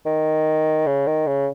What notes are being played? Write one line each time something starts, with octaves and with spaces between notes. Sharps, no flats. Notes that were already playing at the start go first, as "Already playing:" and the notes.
D#3
C#3
D#3
C#3